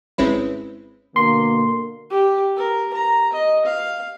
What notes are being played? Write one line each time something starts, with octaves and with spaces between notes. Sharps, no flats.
G#1 G#3 C4 C#4 E4 B4
B2 D3 A#3 C6
G4
A#4
A#5
D#5
F5